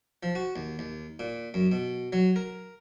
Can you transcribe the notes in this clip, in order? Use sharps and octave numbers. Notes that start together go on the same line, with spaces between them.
F3
F#4
D#2
D#2
A#2
F#2
B2
F#3
A#4